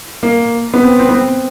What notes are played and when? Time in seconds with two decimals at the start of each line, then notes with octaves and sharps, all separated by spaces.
0.23 A#3
0.74 B3
0.83 C4
0.99 C4
1.09 B3
1.14 C4